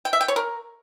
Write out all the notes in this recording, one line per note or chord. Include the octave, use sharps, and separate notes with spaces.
G5
E5
G5
C#5
A#4